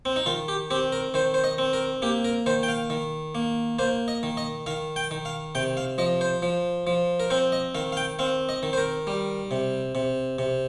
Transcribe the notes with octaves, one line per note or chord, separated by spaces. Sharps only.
C4
D#4
D#3 F4
G4
C4 G4
A#4
D#3 C5
C5
D#5
C4
A#4
A#3 G4
A#4
D#3 C5
G5
F5
D#3
A#3
A#3 C5
D#5
D#3
D#5
D#3 F5
G5
D#3
F5
C3 G5
F5
F3 D#5
C5
F3
F3
A#4
C4 C5
D#5
D#3 F5
F5
G5
C4 F5
D#5
D#3
C5
A#4
G3
C3
C3
C3